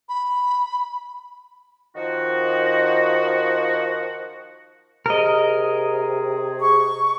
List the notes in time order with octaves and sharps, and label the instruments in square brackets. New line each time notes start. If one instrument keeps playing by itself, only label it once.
[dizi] B5
[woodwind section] D#3 F3 F#4
[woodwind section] C3 G#4 [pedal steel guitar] A#4 D#5
[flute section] C#6